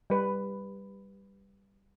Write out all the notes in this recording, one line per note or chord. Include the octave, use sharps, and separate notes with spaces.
G3 B4